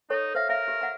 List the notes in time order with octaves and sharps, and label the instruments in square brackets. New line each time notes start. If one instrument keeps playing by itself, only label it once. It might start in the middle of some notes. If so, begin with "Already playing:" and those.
[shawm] D#4 [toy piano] A4 C#5 C#6
[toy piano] C5 E5 [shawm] F5
[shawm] A#4 [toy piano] E5 F5
[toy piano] G4
F#5 A#5